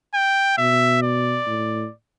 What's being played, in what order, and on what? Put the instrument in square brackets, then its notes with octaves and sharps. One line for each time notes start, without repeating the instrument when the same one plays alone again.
[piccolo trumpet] G5
[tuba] B2 [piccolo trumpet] E5
[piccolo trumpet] D5
[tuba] A2